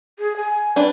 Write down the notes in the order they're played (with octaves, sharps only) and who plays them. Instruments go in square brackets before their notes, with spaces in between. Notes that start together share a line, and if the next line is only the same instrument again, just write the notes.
[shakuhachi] G#4
G#5
[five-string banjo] D4 B4